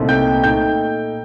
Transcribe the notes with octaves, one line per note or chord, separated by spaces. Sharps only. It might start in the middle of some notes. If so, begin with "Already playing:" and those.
Already playing: C2 A#2 A3 C4 D#4
G5 G6
A#2 A3 D#4 G5 G6